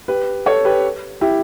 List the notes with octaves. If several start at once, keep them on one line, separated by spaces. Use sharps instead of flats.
G4 B4
A4 C#5
G4 B4
E4 G4